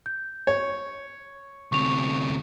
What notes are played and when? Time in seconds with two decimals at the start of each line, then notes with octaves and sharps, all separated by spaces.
0.06 G6
0.47 C#5
1.72 D2 C3 C#6 F7